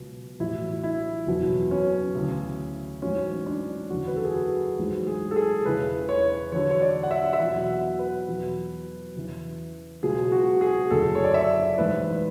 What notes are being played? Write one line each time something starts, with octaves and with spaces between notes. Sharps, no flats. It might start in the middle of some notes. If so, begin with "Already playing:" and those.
Already playing: C#2 B2 F#3
A1 A2 F#3 E4
E4
F#1 E2 B2 F#3
C#4
D2 C#3 E3
A1 G#2 F#3 C#4
D4
F#1 E2 D3 F#4
B4
A4
G#4
F#4
A1 G#2 F#3
G#4
A4
G#4
E1 E2 C#3 E3 B4
C#5
E2 D3 F#3 C#5
C#5
D5
F#5
E5
E5
E2 B2 F#3 F#5
F#5
B4
E2 B2 F#3
E2 C#3 E3
C#2 B2 F#3 G#4
F#4
G#4
F#1 F#2 D3 A4
C#5
D5
E5
A1 G#2 E3 B4